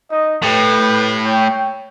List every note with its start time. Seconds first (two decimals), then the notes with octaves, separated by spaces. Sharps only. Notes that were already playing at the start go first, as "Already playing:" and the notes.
0.10 D#4 D#5
0.43 A2 G4 B4 G5
1.25 C#5 G5